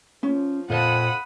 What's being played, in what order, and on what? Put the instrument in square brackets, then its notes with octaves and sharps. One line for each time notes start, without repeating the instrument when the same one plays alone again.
[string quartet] F3 [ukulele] C#4
[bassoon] F2 [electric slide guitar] A#2 C5 A5 [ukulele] F4 [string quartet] F#5 B5 D#6